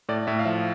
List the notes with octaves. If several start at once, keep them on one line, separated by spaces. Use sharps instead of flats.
A2 D5
A2 E5
F5
F3 E5